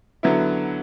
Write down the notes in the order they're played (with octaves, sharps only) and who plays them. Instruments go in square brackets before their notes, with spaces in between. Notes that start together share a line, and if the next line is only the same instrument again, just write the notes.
[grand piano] D3 F#3 B3 E4